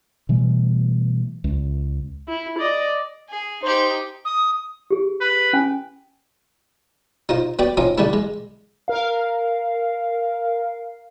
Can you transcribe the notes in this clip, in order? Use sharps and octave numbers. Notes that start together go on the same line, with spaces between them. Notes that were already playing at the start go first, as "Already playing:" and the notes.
B2 E3 G3 A3
C#2
E4
D5 D#5
G#4
D#4 G4 C5
D#6
G4 G#4
B4
C#4 G#5
D#4 F4 C5
B3 F#4 D5 G5
C4 C#4 D#4 F4
D3 G3 A3 E4
G#3
A#4 F5